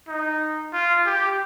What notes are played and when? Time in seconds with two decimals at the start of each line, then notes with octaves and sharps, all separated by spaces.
0.08 D#4
0.73 F4
1.06 G4